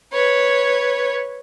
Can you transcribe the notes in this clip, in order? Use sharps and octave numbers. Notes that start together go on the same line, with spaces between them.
B4 C#5